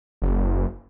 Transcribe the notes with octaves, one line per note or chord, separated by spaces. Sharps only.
F#1